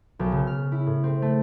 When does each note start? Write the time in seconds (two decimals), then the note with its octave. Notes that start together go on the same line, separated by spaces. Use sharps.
0.19 B1
0.32 C#3
0.47 F6
0.72 E4
0.87 A2
1.04 C4
1.22 A3